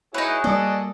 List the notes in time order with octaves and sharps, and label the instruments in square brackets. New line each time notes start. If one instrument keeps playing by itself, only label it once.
[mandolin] D#4 B4 [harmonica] E4 C#5 [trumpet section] F#4 G#4
[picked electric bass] G3 A#3 [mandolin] A4 [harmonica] D5 D#5